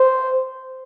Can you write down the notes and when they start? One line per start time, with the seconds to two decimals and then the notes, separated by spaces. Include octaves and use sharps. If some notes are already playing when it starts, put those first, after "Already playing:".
Already playing: C5